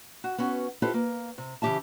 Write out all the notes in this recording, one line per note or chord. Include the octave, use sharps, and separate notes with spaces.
F#4
B3 C#4 F#4
E4 F4 G4 A4 B4 C5
A#3
C3
C#3 E3 F#3 G4 E5 A5